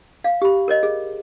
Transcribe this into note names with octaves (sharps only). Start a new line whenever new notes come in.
F5
G4 B5
A#4 C#5 D#5
G#4